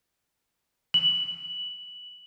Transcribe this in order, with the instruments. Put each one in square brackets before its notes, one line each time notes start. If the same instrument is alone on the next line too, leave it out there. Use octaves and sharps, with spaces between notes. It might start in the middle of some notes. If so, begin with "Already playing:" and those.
[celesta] F#7